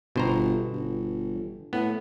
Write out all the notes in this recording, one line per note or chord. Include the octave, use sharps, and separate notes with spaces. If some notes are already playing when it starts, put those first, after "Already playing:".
G1 B2 C5 A#5
G1
A2 B3